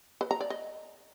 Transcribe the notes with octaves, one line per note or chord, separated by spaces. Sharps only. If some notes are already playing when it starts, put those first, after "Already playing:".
B4
A#5
D5
D#5